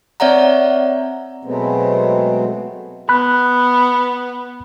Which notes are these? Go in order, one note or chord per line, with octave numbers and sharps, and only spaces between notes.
C4 C#5 D5 E5 F#5 A#5
B2 F#3 G#3 A3 B3 C4
B3 B5 F#6